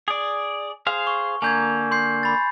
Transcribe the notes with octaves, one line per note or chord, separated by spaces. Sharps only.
G#4 D5
G#4 C5 F5
C#6
D3 A#3 G#5 G6 G#6
C6 G6 C7
B5 A6